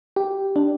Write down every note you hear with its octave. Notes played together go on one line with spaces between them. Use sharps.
G4
D4